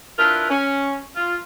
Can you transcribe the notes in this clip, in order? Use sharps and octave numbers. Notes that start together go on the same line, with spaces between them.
D4 E4 F4 A#4 B4
C#4
F4